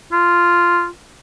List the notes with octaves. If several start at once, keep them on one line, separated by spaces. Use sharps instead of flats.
F4